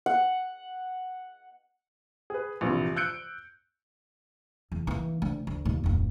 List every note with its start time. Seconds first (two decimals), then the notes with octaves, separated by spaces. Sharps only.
0.06 F#5
2.30 G#4 B4
2.61 A#1 E2 G2 C3
2.96 E6 F#6 G6 C#7 D7
4.72 E2
4.87 E3 A#3
5.22 D2
5.47 D2
5.65 D#2 A#2
5.84 D1 F2